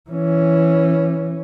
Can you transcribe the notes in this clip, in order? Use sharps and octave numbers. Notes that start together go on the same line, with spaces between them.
E3 C#4